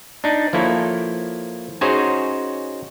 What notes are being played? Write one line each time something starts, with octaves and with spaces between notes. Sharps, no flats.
D4 D#4
F3 A#3 E4 A4 C#5
C#4 D#4 F#4 G#4 C5 C#5